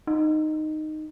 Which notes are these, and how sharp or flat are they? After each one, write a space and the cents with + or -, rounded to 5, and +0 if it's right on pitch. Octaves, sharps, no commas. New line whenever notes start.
D#4 -10